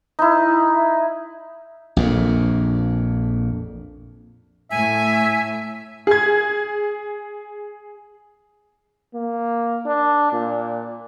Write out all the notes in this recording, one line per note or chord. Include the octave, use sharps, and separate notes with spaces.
D#4 E4
A#1 F2 A#2
A2 A3 E5 G#5
G#4 G#6
A#3
D4
A#2